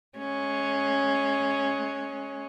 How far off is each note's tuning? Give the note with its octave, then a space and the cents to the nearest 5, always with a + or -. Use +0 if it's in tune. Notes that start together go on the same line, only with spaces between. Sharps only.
G#3 +30 C#4 +0